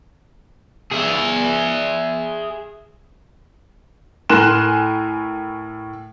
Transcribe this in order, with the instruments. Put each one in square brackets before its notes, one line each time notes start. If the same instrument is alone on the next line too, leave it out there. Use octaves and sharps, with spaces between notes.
[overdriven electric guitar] G#4 E5
[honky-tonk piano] A2 A#4 G#5 C6 F#6 E7